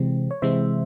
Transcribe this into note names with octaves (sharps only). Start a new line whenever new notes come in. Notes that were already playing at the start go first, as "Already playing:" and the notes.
Already playing: C3 E3 G#3 C4
C#5
C3 E3 G#3 C4 C5 E5